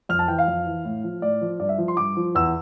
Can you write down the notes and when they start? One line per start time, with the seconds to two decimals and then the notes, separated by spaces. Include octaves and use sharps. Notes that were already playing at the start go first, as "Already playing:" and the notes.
0.09 F2 F6
0.19 A5
0.28 E3 G5
0.39 F5
0.48 F2
0.66 E3
0.85 A2
1.04 F3
1.22 A2 D5
1.41 F3
1.59 G2 D5
1.69 E5
1.78 F3
1.88 C6
1.97 G2 D6
2.17 F3
2.35 E2 E6